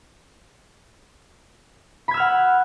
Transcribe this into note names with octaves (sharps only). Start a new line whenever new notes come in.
F#5 B5 E6 F6 G#6